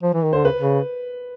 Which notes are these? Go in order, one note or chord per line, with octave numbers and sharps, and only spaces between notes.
F3
E3
D#3
D3 C5
C#3 B4
C#3